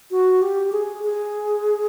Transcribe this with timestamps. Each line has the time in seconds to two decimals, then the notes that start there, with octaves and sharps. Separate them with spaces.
0.11 F#4
0.42 G4
0.72 G#4
1.04 G#4